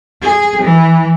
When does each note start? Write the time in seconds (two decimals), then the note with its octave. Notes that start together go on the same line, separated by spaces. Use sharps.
0.23 G#4
0.62 E3